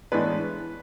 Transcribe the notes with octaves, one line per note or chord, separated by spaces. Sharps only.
A2 E3 G#3 B3 D4 B4